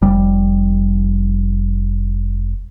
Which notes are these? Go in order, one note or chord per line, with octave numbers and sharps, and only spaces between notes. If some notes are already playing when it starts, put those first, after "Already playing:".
F1 G3